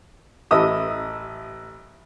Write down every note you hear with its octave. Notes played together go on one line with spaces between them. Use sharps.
A1 E4 D#5 D#6 E6